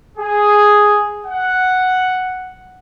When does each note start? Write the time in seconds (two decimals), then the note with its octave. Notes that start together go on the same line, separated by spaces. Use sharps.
0.18 G#4
1.26 F#5